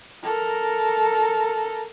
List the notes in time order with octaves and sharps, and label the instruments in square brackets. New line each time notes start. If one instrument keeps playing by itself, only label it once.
[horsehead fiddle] A4 A#4